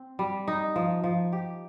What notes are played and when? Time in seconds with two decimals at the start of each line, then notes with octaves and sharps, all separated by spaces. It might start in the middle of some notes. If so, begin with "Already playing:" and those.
Already playing: C4
0.19 G3
0.48 D#4
0.76 F3
1.04 F3
1.32 G4